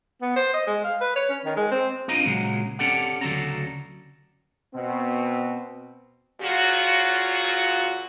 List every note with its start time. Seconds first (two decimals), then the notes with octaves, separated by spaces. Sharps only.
0.22 B3
0.36 C5
0.54 D#5
0.67 G#3
0.84 F5
1.01 B4
1.16 C#5
1.29 C#4
1.45 D#3
1.57 G#3
1.71 C4
2.08 C4 D4 F4 D#5 A#5
2.25 A#2 C#3 F#3 G#3
2.79 C4 C#4 G4 A4 D5 F#5
3.21 D2 C#3 F#3 A4 D5 A#5
4.75 B2 C4
6.41 A#2 C#3 F#3 F4 F#4